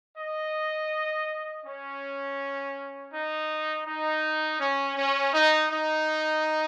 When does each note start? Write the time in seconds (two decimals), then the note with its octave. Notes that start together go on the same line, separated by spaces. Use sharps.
0.18 D#5
1.65 C#4
3.13 D#4
3.86 D#4
4.59 C#4
4.96 C#4
5.33 D#4
5.70 D#4